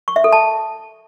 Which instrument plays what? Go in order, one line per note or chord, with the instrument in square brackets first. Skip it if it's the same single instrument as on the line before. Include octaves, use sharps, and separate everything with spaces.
[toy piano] C#6
E5
A4
A5